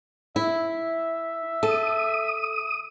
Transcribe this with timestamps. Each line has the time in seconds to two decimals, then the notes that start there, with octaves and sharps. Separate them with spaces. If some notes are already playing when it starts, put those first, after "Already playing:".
0.36 E4 E5
1.63 A4 D#6